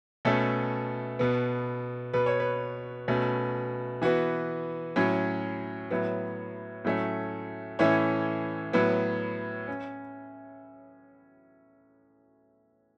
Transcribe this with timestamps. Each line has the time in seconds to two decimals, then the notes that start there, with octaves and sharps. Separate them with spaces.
0.25 B2 A3 C#4 A4
1.19 B2 B3
2.13 B2 B3 B4
2.26 C#5
2.40 B4
3.08 B2 A3 C#4
4.02 E3 B3 F#4
4.96 A2 F#3 C#4
5.91 A2 F#3 B3
6.84 A2 F#3 A3 C#4
7.79 A2 E3 A3 C#4 C#5
8.73 A2 F#3 B3
9.68 C#4